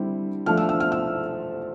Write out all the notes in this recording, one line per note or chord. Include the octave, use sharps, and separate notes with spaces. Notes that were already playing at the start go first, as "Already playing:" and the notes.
Already playing: D3 G3 C4 E4
F3 A3 D4 F6
E6
E6
F6
E6